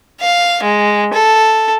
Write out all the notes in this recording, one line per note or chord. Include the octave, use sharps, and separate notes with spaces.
F5
G#3
A4